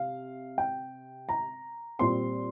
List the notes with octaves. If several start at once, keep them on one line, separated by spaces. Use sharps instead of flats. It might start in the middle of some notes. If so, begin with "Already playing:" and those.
Already playing: C3 F5
G5
A#5
A#2 G3 C4 C6